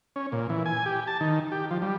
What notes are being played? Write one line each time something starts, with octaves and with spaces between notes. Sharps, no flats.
C#4
A#2
E3
G#5
G4
A5
D#3
G4
F3
G3